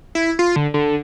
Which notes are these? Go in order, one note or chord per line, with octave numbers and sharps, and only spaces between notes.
E4
F4
D3
D3